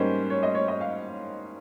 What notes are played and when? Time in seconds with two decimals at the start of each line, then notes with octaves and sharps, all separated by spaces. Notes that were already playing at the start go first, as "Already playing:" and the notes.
Already playing: G#2 G3 A#3 C#4 C5
0.30 C#5
0.43 D#5
0.55 C#5
0.68 D#5
0.81 F5